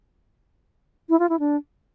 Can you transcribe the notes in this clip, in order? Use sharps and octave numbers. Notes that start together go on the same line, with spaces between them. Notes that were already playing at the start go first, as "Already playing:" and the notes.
E4
F4
E4
D4